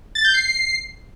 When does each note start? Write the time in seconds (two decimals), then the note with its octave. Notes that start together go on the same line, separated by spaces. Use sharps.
0.15 A6
0.25 G6
0.34 C7